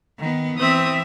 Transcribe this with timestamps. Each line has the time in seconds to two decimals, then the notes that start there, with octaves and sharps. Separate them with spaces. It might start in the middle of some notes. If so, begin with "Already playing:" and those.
0.19 D#3 B3
0.58 E3 C4 E5 D#6